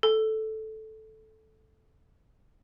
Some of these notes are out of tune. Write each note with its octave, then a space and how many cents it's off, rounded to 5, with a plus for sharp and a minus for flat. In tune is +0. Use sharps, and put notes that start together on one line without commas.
A4 -10